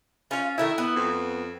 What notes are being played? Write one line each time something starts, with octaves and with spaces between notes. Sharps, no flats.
C#4 F4 F5
D#3 A3 E4 E5
B3
F2